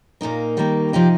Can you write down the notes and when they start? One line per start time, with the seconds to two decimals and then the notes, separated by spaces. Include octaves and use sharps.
0.21 A#2 A#3 D#4 A#4
0.57 D#3 G3 A#3 D#4
0.93 C3 F3 D#4 G4